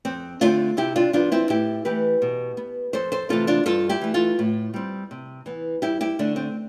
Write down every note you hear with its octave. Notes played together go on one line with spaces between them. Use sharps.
F2 C4
D3 A3 C4 D4 F4
C3 E4 G4
D4 F4
F3 B3 D4 F4
C4 E4
A2 E4 G4
E3 A3 G4 B4
B2
B3
F2 A4 C5
A4 C5
C3 E3 A3 C4 F4 A4
D4 F4
G2 F4 A4
E4 G4
E3 A3
F4 A4
A2
G3 C4
C3
E3 B3
G2 E4 G4
E4 G4
D3 A3 D4
C4